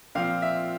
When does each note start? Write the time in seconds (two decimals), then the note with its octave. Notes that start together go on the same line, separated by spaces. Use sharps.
0.15 A#2 F3 C4 F5
0.42 E5